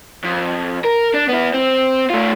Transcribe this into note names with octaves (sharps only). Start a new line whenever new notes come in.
F2
A#4
D4
B3 E4
C4
A3 F4